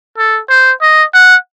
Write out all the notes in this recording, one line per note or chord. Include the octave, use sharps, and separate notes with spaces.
A4
C5
D#5
F#5